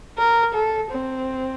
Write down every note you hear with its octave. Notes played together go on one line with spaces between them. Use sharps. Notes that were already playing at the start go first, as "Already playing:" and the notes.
A#4
A4
C4